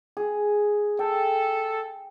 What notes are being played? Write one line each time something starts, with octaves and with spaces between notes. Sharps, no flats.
G#4
A4 G5